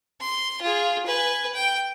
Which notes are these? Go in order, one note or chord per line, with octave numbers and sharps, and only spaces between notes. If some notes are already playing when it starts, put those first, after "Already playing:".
C6
F4 G#4
B4 G#5
G5